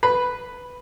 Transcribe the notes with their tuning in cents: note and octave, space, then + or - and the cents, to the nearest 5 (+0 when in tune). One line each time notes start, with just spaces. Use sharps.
B4 +0 B5 +0